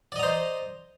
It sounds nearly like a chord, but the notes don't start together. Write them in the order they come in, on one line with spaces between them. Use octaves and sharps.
D5 D#5 A#5 C5